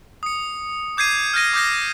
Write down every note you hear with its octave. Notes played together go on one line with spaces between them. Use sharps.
D#6 C#7
D6 G6 G#6 C7 D#7
F6 G6 A#6 D#7
D6 D#6 F6 G6 A#6 C7